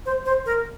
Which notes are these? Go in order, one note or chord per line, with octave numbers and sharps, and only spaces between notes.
C5
C5
A#4